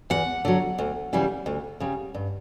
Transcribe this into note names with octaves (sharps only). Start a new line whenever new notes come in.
E2 F#5
D3 F#3
D2
C#3 E3 G3
D2
C#3 G3
G2